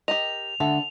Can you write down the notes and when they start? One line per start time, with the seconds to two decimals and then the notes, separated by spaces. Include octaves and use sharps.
0.08 G4 A#4 D#5 F7
0.60 D3 A4 E5 F#5